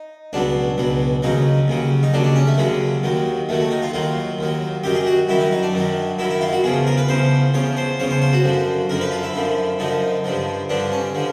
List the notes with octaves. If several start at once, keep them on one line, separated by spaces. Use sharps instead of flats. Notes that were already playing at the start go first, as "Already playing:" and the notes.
Already playing: D#4
C#2 B2 F#3 D4
C#2 B2 F#3
D#2 C#3 F#3 D#4
D#2 C#3 F#3
D#4
D#2 C#3 F#3 D4
D4
C#4
A3
D#2 C#3 F#3 G#3
D#2 D#3 F#3
D#2 D#3 F#3 A3
A3
D#4
F4
D#2 D#3 F#3 F4
D#2 D#3 F#3
F#2 D#3 F#3 G4
G#4
F#4
F#2 D#3 F#3 E4
D#4
D#4
D4
F#2 D#3 F#3
F#2 D#3 F#3 E4
E4
F4
F#4
E2 C#3 F3 G#4
A#4
B4
E2 C#3 F3 C5
E2 C#3 F3 C#5
C5
E2 C#3 F3 C#5
C5
C5
F#4
F#2 D3 F3
F#2 D3 F3 A#4
B4
F4
E4
F#2 D3 F3
F#2 D3 F3 D#4
G2 D3 F3
G2 D3 F3 D4
C#4
D3 F3